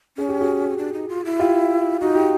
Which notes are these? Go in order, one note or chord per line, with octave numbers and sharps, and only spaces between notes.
C#4 G#4
G4
F#4 G#4
D4
D#4
F4
E4
F4 G4
D#4 F#4
G4